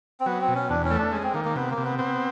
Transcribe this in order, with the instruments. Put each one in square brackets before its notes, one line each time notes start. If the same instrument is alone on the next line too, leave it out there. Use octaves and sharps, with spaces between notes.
[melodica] C4
[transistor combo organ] F#3 [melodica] B3
[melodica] C4
[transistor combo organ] B2
[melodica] C#4
[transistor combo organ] E2 [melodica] D4
[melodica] C#4
[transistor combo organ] A3
[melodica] D4
[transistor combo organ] G#3 [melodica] C#4
[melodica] C4
[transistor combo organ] D#3 [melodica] A#3
[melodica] A#3
[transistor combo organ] C3 [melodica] B3
[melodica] A#3
[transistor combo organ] C3
[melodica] B3
[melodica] B3 [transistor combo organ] C4